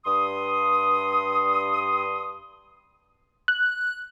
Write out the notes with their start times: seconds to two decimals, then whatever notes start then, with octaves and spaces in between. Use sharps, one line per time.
0.06 G2 C6 D#6
3.48 F#6